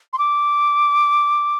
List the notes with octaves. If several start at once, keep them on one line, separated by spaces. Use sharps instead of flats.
C6
D6